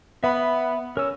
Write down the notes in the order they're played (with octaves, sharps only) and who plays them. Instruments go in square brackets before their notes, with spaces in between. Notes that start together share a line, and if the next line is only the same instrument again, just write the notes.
[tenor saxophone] B3 [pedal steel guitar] E5 B5
[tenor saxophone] C#4 [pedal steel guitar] A#4 E6